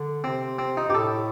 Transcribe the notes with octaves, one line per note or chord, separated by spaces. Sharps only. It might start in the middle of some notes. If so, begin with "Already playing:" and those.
Already playing: D3
C3 C4
C4
D#4
G2 G4
A2 A4